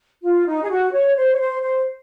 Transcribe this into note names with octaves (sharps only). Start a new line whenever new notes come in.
F4
D#4
G#4
F#4
C#5
C5
C#5
C5
C5